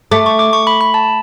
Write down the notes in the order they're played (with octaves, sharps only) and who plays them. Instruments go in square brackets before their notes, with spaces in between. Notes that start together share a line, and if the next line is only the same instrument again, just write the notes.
[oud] A3 [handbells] D6
[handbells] C#6
D6
C#6
B5
B5
A5